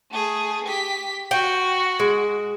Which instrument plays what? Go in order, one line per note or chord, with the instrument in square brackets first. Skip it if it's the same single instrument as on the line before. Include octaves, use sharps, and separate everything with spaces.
[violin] A3 G#4
G4 B6
[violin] F#4 [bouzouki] G5
[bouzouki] G#3